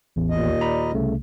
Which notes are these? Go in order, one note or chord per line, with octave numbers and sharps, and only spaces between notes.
A1 E2
D#2 A#2 D#5
D5 A#5 B5
C2 C#3 A3